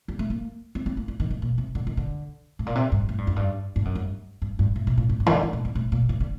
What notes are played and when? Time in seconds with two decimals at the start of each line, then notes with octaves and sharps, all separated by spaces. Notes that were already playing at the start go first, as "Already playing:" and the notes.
0.08 G3
0.19 A3
0.30 A#3
0.75 C4
0.86 C4
0.97 A#3
1.08 G3
1.20 D#3
1.31 G2
1.42 A#2
1.58 C3
1.75 D3
1.87 D#3
1.97 D3
2.59 A2
2.66 A#2
2.75 C3
2.92 G2
3.09 A2
3.18 G2
3.27 F#2
3.36 G2
3.76 G2
3.85 F#2
3.95 G2
4.42 G2
4.59 G2
4.76 A2
4.87 C3
4.98 A#2
5.09 G2
5.20 G2
5.26 D#3
5.32 D3
5.43 F#3
5.53 A2
5.65 G2
5.75 A2
5.92 A#2
6.09 C3
6.20 D3